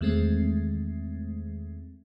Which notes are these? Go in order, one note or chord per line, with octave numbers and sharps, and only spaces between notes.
E2 D#3 G#3 A3 C4